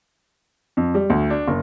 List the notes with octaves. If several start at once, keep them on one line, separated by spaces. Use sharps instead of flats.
F2
G3
D2
D4
F#1